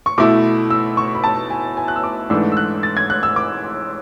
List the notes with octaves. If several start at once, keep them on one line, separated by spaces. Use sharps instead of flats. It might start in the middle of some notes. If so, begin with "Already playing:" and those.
C#6
B2 A3 E4 D6
E6
C#6
B5
A5
G#5
G#5
F#6
E6
D6
G#2 E3 A3 D4 E6
E6
F#6
A6
G#6
F#6
E6
D6